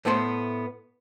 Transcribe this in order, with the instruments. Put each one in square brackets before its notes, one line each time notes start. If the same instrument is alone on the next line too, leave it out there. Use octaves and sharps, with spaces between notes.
[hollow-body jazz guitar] A2 A3 B3 C5 F#5 C6